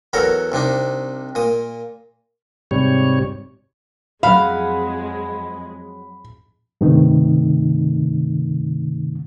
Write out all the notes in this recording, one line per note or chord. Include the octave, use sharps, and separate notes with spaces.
E2 F#3 A4 A#4 F#5 A#5
C2 C3 D4 D#4
A#2 D#6
G#2 C3 G3 C#5
F2 F#3 G#3 F5 F#5 B5
G2 C3 D#3 A3 D#4